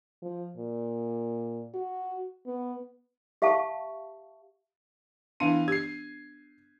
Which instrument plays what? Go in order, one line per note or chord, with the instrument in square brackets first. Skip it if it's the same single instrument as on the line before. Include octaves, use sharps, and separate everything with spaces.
[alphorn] F3
A#2
F#4
B3
[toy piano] G4 E5 F5 A5 C#6
[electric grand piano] E3 F5 D#7 [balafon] B3 D4
[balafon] G4 [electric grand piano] G#6 C7